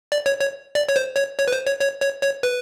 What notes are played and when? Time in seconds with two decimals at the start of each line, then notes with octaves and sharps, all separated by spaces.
0.12 D5
0.26 C#5
0.40 C#5
0.75 D5
0.89 C#5
0.96 C5
1.16 C#5
1.39 C#5
1.48 B4
1.53 C5
1.67 C#5
1.81 C#5
2.02 C#5
2.23 C#5
2.43 B4